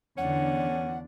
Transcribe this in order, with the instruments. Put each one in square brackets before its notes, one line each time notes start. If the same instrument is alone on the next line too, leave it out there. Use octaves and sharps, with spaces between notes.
[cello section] E2 D3 D4 [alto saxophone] C#4 [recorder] F#5